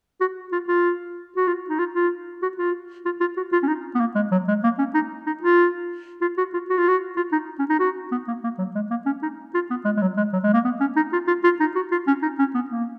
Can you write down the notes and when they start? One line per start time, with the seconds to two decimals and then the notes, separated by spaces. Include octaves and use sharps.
0.21 F#4
0.52 F4
0.68 F4
1.36 F#4
1.48 F4
1.69 D#4
1.79 F4
1.94 F4
2.42 F#4
2.57 F4
3.06 F4
3.21 F4
3.37 F#4
3.53 F4
3.63 C#4
3.68 D#4
3.95 B3
4.00 A#3
4.15 G#3
4.32 F#3
4.48 G#3
4.64 A#3
4.79 C#4
4.95 D#4
5.27 D#4
5.43 F4
6.22 F4
6.38 F#4
6.54 F4
6.70 F#4
6.78 F4
6.88 F#4
7.17 F4
7.32 D#4
7.59 C#4
7.70 D#4
7.80 F#4
8.12 B3
8.28 A#3
8.44 A#3
8.59 F#3
8.75 G#3
8.91 A#3
9.06 C#4
9.23 D#4
9.55 F4
9.70 B3
9.85 G#3
9.97 G#3
10.02 F#3
10.17 G#3
10.33 F#3
10.44 G#3
10.54 A#3
10.65 B3
10.81 C#4
10.96 D#4
11.13 F4
11.28 F4
11.44 F4
11.60 D#4
11.75 F#4
11.92 F4
12.08 C#4
12.22 D#4
12.39 C#4
12.55 B3
12.70 A#3